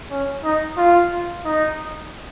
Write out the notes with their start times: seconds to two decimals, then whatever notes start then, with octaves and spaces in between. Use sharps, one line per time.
0.11 C#4
0.44 D#4
0.77 F4
1.45 D#4